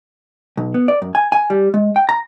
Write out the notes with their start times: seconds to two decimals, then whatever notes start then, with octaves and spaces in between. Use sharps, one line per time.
0.57 B1
0.74 B3
0.88 D5
1.02 F#2
1.15 G#5
1.32 G#5
1.50 G3
1.74 G#3
1.96 G5
2.09 A#5